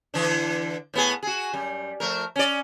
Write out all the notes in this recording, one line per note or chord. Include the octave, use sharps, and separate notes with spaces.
D3 E3 D4
A2 B3 G#4
F#4 G#4
F#2 G3
F3 A3 A#4
C#4 D5